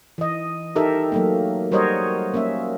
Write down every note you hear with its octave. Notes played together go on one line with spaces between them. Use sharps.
E3 D#5
D#4 G4 A4 A#4 E5
F#3 A3 A#3
G3 F#4 A#4 C5 C#5 D#5
A#3 C#4 E5